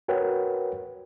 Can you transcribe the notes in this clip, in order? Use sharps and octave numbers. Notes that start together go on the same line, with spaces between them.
F#4 A#4 B4 C#5 F#5 G5